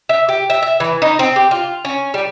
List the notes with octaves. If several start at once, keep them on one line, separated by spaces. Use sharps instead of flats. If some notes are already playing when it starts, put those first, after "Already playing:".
E5
G4
E5
E5
E3
D#4
C4
G4
F4
C#4
G3